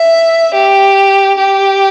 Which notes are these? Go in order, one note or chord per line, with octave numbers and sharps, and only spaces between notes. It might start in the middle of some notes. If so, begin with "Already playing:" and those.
Already playing: E5
G4
G4